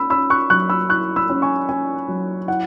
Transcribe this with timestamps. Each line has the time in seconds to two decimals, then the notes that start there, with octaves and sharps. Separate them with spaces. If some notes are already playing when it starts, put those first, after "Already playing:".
Already playing: C#4 B5 E6
0.10 C#4 B5 E6
0.30 C#6 F#6
0.50 F#3 C#6 F#6
0.69 B5 E6
0.89 E4 C#6 F#6
1.16 B5 E6
1.30 C#4
1.42 G#5 C#6
1.69 C#4 G#5
2.08 F#3
2.48 E4 F#5